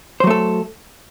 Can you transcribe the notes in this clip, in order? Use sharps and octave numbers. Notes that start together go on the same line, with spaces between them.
F#3 A3 A4 C5